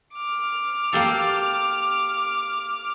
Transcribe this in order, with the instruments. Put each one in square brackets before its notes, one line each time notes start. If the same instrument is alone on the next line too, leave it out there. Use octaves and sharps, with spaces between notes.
[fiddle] D6 F6
[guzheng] A#3 G4 A4